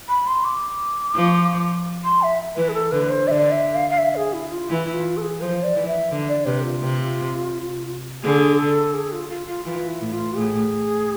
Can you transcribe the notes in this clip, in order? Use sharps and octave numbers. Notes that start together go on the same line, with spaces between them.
B5
C6
D6
F3
C6
E5
E3 B4
G#4
A4
D3 B4
C5
D3 D5 E5
E5
F5
F5
E5
G#4
E4
F4
E3 E4
F4
A4
G#4
F3 C5
D5
E3
E5
D3
D5
C3 B4
F4
C3
D3 G#4
A4
G#4
F4
F4
F4
E3 F4
E4
A2
F4
A2 G#4